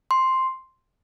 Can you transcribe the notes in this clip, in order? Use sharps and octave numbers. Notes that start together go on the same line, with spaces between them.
C6